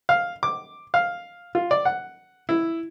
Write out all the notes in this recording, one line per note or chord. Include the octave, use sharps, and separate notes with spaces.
F5
D6
F5
F4
D5
F#5
E4